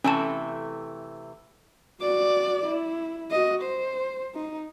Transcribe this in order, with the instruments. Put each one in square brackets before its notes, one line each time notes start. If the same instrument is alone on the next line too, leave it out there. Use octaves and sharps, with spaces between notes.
[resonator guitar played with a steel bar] C3 E3 A3 [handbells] C#4 A5
[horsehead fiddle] F#4 D5
E4
F#4 D#5
C5
D#4